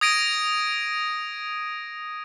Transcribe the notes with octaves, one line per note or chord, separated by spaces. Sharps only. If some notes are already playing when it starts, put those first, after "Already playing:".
D#6 G#6 A#6 D7 D#7